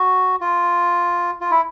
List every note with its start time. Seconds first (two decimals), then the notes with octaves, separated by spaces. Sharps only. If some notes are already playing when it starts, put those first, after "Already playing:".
Already playing: F#4
0.41 F4
1.41 F4
1.51 E4